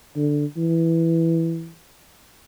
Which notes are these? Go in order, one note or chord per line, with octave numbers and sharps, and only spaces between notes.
D3
E3